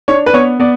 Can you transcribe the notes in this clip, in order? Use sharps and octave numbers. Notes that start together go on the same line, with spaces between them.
D4 C#5
B4
B3 C#5
B3 D5